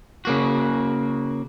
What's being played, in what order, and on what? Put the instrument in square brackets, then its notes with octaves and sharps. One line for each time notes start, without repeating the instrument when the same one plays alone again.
[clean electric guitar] C#3 A#3 F#4